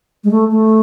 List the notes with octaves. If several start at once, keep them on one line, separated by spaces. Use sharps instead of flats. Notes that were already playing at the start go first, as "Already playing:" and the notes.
G#3
A3
A3